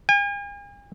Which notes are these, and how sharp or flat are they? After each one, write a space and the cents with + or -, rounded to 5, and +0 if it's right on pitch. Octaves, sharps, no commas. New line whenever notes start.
G#5 -45